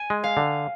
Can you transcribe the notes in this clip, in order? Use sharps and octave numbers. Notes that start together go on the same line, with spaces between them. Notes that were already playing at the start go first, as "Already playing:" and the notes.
Already playing: G#5
G#3
F5
D3